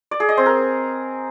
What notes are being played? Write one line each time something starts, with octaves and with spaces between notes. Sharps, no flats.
D5
G#4
D#5
C4
A#4